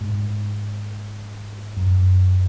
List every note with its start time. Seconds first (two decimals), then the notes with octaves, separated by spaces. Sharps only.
0.01 G#2
1.77 F#2